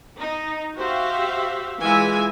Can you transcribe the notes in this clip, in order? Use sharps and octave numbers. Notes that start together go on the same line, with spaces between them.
D#4
F#4 G4 C5 E5 F5
E3 G#3 F4 G#4 E5 G#5